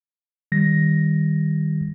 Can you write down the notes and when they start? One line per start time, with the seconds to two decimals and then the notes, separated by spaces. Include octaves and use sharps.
0.52 D#3 G3 A#6